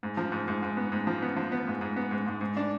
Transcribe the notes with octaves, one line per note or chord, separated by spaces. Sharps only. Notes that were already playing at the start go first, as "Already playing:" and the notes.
G#2
F3
G#2
G#2
G#2
B3
G#2
F3
B3
F3
B3
G#2
G#2
B3
G#2
G#2
G#2
D4